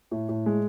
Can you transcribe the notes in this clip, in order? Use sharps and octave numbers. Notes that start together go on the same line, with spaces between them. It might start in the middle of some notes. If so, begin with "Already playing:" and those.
A2
A2
G#3